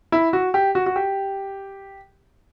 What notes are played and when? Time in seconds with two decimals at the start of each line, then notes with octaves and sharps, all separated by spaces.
0.12 E4
0.33 F#4
0.54 G4
0.75 F#4
0.86 F#4
0.96 G4